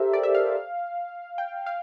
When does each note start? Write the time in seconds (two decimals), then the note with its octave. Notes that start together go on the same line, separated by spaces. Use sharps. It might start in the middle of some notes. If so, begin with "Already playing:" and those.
Already playing: G4 A4 A#4 C5 E5
0.13 D5
0.23 E5
0.35 F5
1.38 G5
1.66 F5